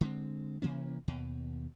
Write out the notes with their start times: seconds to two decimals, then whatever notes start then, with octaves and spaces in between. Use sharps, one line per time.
0.01 D3 G#3 C4
0.62 C3 E3 A#3 C#4
1.08 D#2 B2